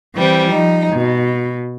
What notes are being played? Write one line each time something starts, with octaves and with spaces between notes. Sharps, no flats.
E3 G3 C4
F3 D#4
B2